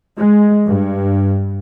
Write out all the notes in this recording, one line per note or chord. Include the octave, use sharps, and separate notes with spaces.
G#3
G2